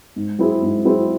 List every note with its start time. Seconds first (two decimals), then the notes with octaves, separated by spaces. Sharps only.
0.16 G#2
0.38 F#3 C4 E4 G#4
0.62 G#2
0.85 F#3 C4 E4 G#4